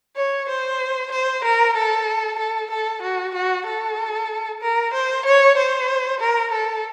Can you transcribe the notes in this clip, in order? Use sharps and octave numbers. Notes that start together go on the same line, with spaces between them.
C#5
C5
C5
A#4
A4
A4
A4
F#4
F#4
A4
A#4
C5
C#5
C5
A#4
A4